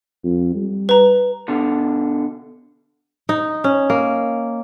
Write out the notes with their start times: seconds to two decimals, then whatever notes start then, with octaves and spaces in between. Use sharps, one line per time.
0.24 F2
0.55 G3
0.89 B4 A#5
1.48 B2 D3
3.29 D#4
3.64 C#4
3.90 A#3